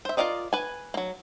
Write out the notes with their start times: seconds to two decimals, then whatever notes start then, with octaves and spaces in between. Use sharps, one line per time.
0.05 C5 E5
0.17 F4 G#4 A#4 D5 D#5
0.53 B4 G#5
0.94 F#3 A#3